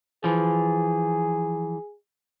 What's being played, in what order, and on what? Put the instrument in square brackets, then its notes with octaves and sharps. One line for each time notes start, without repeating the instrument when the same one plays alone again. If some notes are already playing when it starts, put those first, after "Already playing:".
[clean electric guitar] E3 F3 [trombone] G#4